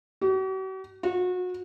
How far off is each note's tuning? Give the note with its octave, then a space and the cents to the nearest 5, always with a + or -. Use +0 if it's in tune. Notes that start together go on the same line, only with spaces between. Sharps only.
F#4 +45
F#4 -30